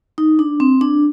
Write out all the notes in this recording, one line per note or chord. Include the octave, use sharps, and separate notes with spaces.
D#4
D4
C4
D4